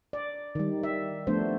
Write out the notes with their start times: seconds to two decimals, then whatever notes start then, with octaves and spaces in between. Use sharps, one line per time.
0.13 D5
0.55 D#3 G3
0.83 E5
1.27 F3 A3 B3 D4 C5